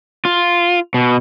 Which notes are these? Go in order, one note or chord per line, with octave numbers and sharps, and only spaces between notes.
F4
B2